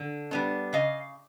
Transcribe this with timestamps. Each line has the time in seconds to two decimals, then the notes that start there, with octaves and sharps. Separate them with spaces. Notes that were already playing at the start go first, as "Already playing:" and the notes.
Already playing: D3
0.31 G3 B3 D4
0.73 C#3 D#5 F5